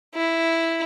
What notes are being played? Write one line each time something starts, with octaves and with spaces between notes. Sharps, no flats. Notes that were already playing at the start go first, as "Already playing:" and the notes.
E4